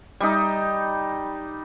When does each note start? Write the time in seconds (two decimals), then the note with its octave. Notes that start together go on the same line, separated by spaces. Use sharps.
0.20 G3 D#4